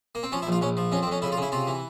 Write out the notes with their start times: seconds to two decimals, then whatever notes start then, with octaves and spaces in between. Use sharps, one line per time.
0.15 A#3
0.23 C4
0.32 F3 C#4
0.42 E4
0.47 A#1 F4
0.61 A#1 C#4
0.77 F3
0.92 F2 C#4
1.03 C4
1.07 F2 C#4
1.22 C#3 E4
1.32 F4
1.37 C#3
1.42 E4
1.52 C3 F4
1.67 E3